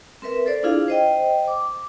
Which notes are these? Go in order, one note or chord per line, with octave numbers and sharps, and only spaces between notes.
C4 A#4 B4 E5
A4 C5 D5
D4 E4 F4 G#4 F5
C5 D#5 G5
D6